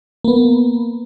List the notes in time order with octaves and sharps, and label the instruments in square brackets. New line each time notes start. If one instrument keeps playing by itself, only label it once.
[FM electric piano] A#3 B3